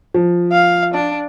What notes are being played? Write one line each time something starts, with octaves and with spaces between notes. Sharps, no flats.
F3
F5
D4